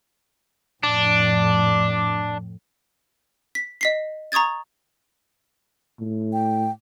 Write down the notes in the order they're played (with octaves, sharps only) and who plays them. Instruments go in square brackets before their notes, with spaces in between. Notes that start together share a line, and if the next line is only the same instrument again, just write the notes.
[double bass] F2 A2 [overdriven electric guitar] D4
[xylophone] B6
D#5 B6 C7
A#5 C#6 D#6 G#6 A6
[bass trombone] A2
[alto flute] G5